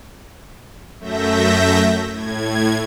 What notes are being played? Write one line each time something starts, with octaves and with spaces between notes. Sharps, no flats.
F#2 A3 E5 G6 A#6
A2 G#6